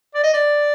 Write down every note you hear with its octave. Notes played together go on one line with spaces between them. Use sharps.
D5
D#5
D5